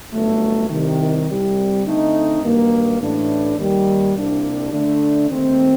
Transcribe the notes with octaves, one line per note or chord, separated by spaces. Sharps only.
G1 F#2 F#3 A3
C2 C3 D#3
C2 C3 G3
D3 A3 C4 D#4
G2 D#3 F#3 A#3
A1 A2 A3 D4
D#2 D#3 G3
C2 C3 G3 A#3 D4
D3 A3 D4
D#2 D#3 A3 C4